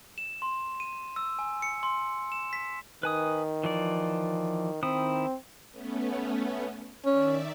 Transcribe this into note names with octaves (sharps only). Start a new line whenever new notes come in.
E7
C6
D#7
E6
G#5
C#7
C6
E7
B6
D#3 B4 G#5 D#6
E3 F3 D5
D#3 C4 E4 D#6
A3 B3 C#4
D#3 C#4 D5 E5